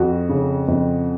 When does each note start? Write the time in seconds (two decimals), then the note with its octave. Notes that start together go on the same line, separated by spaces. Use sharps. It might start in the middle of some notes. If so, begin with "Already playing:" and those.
Already playing: F2 F#4
0.29 C#3
0.68 F2